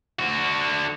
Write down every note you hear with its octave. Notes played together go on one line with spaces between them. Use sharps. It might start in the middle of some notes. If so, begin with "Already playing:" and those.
D3 F#4